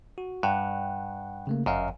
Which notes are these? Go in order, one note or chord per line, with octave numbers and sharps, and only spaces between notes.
F#4
G2 F#5
C#3 A3 A#3
G1 F#2 D#5 F5